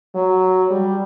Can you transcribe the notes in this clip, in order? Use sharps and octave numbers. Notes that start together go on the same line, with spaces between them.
F#3
G3